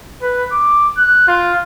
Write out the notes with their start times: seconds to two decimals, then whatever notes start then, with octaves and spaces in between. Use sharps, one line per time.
0.22 B4
0.52 D6
0.97 F#6
1.27 F4